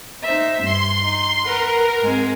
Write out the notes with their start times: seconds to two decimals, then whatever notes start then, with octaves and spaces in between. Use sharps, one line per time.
0.23 D#4 C5 E5
0.64 G2 C6
1.01 D#4
1.45 A#4 B4 F#5 A#5
2.03 G#2 G#3 C4